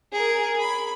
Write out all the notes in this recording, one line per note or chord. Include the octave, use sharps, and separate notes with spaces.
G#4 A#4
B5